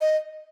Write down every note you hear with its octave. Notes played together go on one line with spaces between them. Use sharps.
D#5